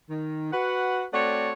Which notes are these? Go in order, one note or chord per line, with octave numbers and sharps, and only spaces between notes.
D#3
F#4 B4 F#5
A3 C4 F#4 C#5 D5 F#5